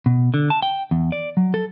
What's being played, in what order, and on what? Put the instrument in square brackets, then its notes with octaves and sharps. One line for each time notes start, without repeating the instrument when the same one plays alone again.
[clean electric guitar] B2
D3
A5
G5
E2
D5
F#3
A4